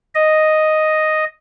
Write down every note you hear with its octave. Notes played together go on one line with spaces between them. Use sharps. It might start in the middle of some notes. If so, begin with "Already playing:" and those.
D#5